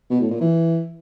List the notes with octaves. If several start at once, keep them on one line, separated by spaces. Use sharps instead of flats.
B2
A2
A#2
E3